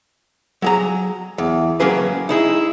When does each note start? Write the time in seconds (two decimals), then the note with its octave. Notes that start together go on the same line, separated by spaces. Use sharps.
0.62 F#3 G#4 A#5
1.38 E2
1.80 F#3 A#3 C#4 G#4 B4
2.29 D#4 E4 G#4